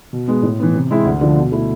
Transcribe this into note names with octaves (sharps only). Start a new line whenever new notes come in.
B2
G#3 B3
A2
E3 B3
C3
G#3 C4 E4
D2
D3 F3
B2
A3 E4